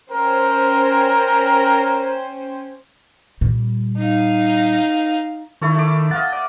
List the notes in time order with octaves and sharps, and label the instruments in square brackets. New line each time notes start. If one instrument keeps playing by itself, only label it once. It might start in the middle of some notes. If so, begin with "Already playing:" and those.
[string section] C#4 C5 G5 [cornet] A#4
[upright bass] A#2 G3
[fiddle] D#4 F5
[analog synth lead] D#3 [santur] E4 A4 C#5
[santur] A3 D6
[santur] D#5 F5 F#5 [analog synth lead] A6
[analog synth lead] D5